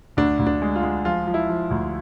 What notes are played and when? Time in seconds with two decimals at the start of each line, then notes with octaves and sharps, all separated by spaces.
0.17 D2 D4
0.39 D2
0.47 D4
0.62 G#3
0.76 F4
0.83 G#3
1.05 F3 F4
1.27 F3
1.34 E4
1.49 F3
1.71 D2